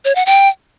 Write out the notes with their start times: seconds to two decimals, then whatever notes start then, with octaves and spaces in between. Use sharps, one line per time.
0.05 C#5
0.15 F#5
0.26 G5